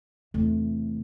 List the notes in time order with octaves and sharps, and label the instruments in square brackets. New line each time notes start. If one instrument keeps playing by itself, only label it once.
[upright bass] E2 C3 [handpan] A3